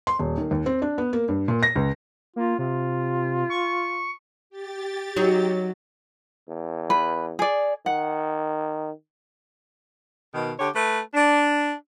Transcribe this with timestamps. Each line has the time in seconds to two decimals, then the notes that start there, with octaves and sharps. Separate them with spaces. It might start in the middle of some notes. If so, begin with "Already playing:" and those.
0.07 C6
0.19 D#1
0.37 D#3
0.51 D#2
0.66 C4
0.82 D4
0.98 B3
1.13 A#3
1.28 G2
1.48 A#2
1.63 A#6
1.76 C#2
2.36 A#3 F4
2.59 C3 F4
3.50 C#6
4.50 G4 A6
5.16 F#3 D#4 F#4
6.48 E2
6.90 B4
7.39 G#4 D5
7.86 D#3 F#5
10.34 B2 D#3
10.59 D3 G4 C#5
10.75 A3 B4
11.14 D4